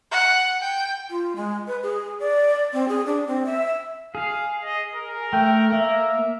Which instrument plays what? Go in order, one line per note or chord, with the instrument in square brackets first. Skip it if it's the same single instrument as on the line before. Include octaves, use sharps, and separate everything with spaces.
[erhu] F#5
G5
[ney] F4
G#3
B4
G#4
D5
C4
G#4
D4
C4
E5
[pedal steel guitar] G#4 [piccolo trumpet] F5
[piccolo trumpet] D#5
A#4
[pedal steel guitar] A3 [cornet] G5
[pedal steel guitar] A#3 [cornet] E5